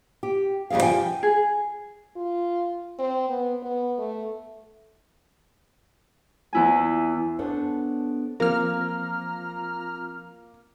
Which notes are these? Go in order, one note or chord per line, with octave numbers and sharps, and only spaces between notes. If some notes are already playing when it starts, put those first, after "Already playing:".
G4
F2 G3 D#4 G#4 F5
F3 G4 G5 G#5
G#4
F4
C4
B3
B3
A3
E2 E4 G#5
B3 D4 A4 C5 C#5
F3 A#3 C4 F4 A#5 F6